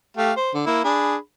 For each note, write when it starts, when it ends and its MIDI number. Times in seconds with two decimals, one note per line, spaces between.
0.17 0.32 57
0.17 0.32 67
0.17 0.32 77
0.37 0.52 72
0.54 0.63 50
0.67 0.82 58
0.67 0.82 64
0.85 1.16 62
0.85 1.16 68
0.85 1.16 83